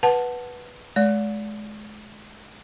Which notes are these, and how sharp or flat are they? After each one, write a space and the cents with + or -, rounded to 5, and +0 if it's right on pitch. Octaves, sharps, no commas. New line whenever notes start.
B4 -5 F#5 +0 A5 +0
G#3 +35 D5 -35